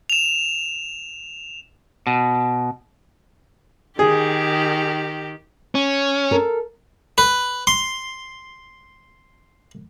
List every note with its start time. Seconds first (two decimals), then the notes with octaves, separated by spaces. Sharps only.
0.10 E7 F7
2.07 B2
3.99 D#3 G4 G#4
5.75 C#4
6.31 A4 A#4
7.18 B4
7.67 C6